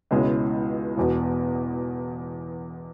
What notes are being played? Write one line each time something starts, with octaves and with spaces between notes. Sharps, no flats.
C#2 B2 G#3 C#4 E4
E1 E2 B2